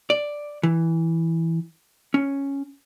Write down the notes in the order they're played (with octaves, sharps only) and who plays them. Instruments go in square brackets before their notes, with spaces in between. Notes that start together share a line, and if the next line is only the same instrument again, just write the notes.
[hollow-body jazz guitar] D5
E3
C#4